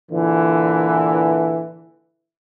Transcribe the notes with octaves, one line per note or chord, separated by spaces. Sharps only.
A#2 D3 E3